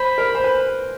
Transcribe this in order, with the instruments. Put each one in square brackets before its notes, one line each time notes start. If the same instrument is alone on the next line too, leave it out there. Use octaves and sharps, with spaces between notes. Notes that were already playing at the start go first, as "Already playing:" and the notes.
Already playing: [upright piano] C5 [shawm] B5
[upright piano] A#4
C5
B4